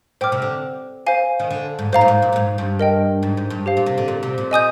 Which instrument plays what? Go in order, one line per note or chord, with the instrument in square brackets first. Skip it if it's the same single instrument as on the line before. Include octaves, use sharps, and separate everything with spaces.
[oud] A#2 [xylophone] C5 G5 D6 F6
[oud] C3
D3
[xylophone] C5 F5 G#5
[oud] D#3
D3
G#2
[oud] G#2 [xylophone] C5 F5 A#5
[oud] A#2
G#2
A#2
A#2
G#2
G2
[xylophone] A#4 D#5 G5
[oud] G#2
G#2
G2
[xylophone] G4 C5 F5
[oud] A#2
C3
D3
A#2
C3
A#2
[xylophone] D#5 G#5 D#6 G6